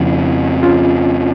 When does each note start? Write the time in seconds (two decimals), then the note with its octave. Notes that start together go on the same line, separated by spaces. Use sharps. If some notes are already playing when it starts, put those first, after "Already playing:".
Already playing: F2 C#3 F3 C4 E4
0.63 C#4 F4